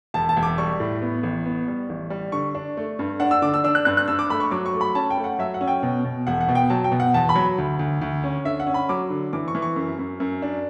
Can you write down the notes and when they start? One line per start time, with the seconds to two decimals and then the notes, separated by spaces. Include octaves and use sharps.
0.14 E1 A5
0.29 A5
0.37 E1
0.43 D6
0.58 G3 C#6
0.80 A2
1.02 B3
1.23 A1
1.46 B3
1.68 G3
1.89 A1
2.10 G3
2.32 D3 C#6
2.54 D4
2.77 A3
2.99 G2
3.20 D4 F#5
3.31 E6
3.42 D3 D6
3.54 E6
3.64 D4 E6
3.75 F#6
3.85 G2 F#6
3.97 F#6
4.08 G2 E6
4.19 D6
4.30 A3 B5
4.40 C#6
4.51 F#3 D6
4.66 C#6
4.73 A3
4.81 B5
4.95 C#4 A5
5.10 G5
5.17 A3
5.24 F#5
5.39 F#3 E5
5.54 F#5
5.61 C#4
5.68 G5
5.83 B2
6.04 B2
6.27 E1 F#5
6.41 F#5
6.48 B2
6.55 G5
6.70 F#3 A5
6.84 G5
6.92 B2
7.00 F#5
7.14 E2 A5
7.29 B5
7.35 F#3
7.58 D2
7.79 D2
8.01 D2
8.24 C#4
8.45 D3 E5
8.60 F#5
8.67 C#4
8.74 B5
8.89 F#3 D6
9.10 D3
9.33 E3 D6
9.48 C#6
9.55 E3
9.62 C#6
9.76 F#2
9.99 F#2
10.20 F#2
10.42 D4